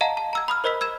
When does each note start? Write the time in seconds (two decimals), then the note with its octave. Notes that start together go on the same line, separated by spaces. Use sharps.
0.01 D#5 F5 F#5 A5 A#5
0.17 A5
0.33 A#5 E6 G#6
0.48 B5 D#6 F6
0.64 A#4 C5 D#5 B5 E6 B6
0.81 E6 G#6 E7